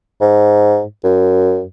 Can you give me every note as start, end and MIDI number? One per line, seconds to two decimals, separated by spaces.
0.21 0.83 44
1.04 1.64 42